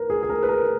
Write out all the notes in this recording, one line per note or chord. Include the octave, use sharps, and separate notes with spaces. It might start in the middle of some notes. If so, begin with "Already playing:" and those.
Already playing: A#4 B4
G#4
G#4
A#4
B4
A#4